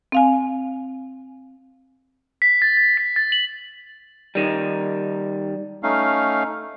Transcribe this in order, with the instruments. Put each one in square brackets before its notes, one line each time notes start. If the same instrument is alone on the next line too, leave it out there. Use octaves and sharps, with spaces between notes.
[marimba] C4 F5 G#5
[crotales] B6
A6
A6
B6
A6
F#7
[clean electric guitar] D#3 G3
[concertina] A3 C#4 D#4 F5